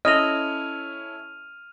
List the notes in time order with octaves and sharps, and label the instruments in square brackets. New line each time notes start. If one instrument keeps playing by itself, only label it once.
[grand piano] C#4 E4 A4 [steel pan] D#5 [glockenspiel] F6 D#7 F7